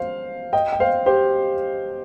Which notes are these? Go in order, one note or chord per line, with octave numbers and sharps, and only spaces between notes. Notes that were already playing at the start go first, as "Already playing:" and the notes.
Already playing: C5 F5
D#5 G5
G5
C5 F5
G4 C5